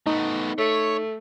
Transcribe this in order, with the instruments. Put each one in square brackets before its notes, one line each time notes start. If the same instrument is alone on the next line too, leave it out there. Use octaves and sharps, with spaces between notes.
[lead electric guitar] A3 B3 [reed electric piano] D#4
[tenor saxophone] A3 [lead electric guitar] C#5